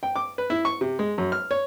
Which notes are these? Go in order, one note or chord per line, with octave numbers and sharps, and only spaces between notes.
G5
D6
B4
E4
C#6
C3
G#3
F#2
F6
C#5